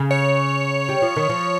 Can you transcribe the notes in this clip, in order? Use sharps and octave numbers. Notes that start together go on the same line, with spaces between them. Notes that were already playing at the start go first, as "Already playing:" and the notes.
Already playing: C#3
C#5
G3
F3
D#3
F3